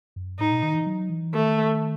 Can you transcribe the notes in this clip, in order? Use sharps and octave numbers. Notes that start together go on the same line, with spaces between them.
F#2
A2 D#4
B2
D#3
E3
F#3
E3
D#3 A3